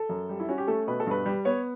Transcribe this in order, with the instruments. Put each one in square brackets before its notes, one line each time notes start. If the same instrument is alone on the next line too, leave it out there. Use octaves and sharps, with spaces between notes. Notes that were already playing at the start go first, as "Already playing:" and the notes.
Already playing: [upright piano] A4
F#2
G3
E4
C#4 F#4
G4
A3 A4
B2 B4
A4
G2 B4
G3
B3 C#5